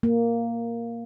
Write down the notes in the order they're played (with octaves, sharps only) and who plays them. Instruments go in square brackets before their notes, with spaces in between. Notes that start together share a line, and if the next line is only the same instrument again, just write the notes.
[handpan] A#3